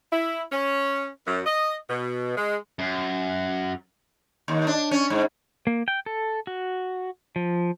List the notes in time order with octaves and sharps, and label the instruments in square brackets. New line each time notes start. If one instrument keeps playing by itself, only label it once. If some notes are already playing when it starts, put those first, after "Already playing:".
[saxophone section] E4
C#4
F#2
D#5
B2
G#3
[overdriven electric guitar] F#2
[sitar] D#2
D4
C#4
G#2
[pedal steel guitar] A#3
G5
A4
F#4
F3